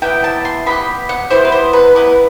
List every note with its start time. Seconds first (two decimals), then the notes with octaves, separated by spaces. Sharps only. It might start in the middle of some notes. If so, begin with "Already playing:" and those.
0.02 B3 E4 G4 G5
0.24 A5
0.45 C6
0.66 B3 E4 G4 B5
1.09 F#5
1.30 B3 E4 G4 C5
1.45 B4
1.52 C5
1.73 B4
1.95 B3 E4 G4 B4